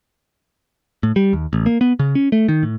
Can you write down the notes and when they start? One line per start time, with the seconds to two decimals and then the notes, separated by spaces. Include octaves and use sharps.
1.03 A2
1.16 G3
1.33 D#2
1.53 A1
1.66 A#3
1.81 B3
1.99 C#3
2.15 C#4
2.32 A3
2.48 D#3
2.63 A2